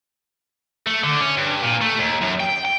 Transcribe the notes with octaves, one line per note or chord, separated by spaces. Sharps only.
A3
D3
C#4
G2
A#2
A3
D#2
F#2
G5
G5